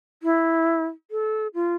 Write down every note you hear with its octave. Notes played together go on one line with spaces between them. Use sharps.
E4
A4
F4